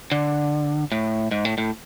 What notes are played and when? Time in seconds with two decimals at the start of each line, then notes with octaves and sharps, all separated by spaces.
0.12 D3
0.92 A2
1.31 G#2
1.45 A2
1.58 A2